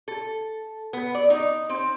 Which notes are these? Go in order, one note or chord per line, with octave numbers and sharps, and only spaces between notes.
A4
B3
D5
D#4
C4